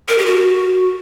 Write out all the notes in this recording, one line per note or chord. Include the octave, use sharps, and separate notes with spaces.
A#4
G4
F#4